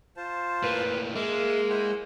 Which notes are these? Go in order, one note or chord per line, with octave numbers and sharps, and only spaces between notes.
F4 C5 A5
A2 A#3 B4
G#3 A#3 E5 F5
E4 C5 F#5